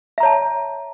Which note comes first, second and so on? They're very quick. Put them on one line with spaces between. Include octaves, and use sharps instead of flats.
E5 A#5 C#5 A5